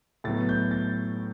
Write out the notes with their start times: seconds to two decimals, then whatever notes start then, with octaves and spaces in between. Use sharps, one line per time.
0.24 A2 F#3 B3 A6
0.49 G6
0.71 A6